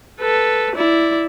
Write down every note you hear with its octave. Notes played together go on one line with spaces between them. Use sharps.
A4 B4
E4 D5